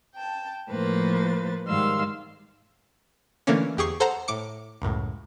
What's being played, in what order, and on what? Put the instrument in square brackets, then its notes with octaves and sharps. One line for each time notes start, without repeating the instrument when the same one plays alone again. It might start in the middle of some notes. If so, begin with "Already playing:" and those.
[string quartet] G5 A5
A2 F3 A#3 B4 C5 A6
G#2 D#3 G3 F5 C6 E6
[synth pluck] D3 E3 A3 A#3 C#4
E2 G4 G#4 C#6 C7
A4 C5 F#5 A5 A#5
A2 D6 C#7
C#2 F#2 A2